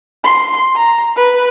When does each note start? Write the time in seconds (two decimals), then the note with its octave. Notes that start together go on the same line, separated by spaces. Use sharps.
0.24 C6
0.76 A#5
1.16 B4